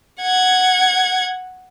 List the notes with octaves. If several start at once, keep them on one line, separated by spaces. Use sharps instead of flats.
F#5 G#6